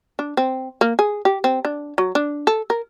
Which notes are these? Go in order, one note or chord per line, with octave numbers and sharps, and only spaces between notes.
D4
C4
A#3
G#4
G4
C4
D4
F#3
D4
A4
A#4